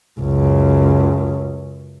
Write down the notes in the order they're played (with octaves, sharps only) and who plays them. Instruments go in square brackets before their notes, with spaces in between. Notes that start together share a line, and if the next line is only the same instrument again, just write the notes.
[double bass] C#2 F#2